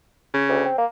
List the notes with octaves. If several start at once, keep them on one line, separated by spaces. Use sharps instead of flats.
C#3
D2
C4
A#3